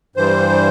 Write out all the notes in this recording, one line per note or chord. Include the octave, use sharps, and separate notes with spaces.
G2 E3 G3 C5